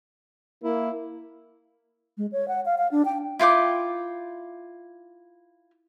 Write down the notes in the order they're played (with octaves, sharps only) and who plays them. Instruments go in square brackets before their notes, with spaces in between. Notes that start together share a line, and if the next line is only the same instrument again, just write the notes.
[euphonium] A#3 [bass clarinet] E4
[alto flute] G#3
C#5
F#5
F5
F5
D4
G5
[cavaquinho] E4 F4 G5 D6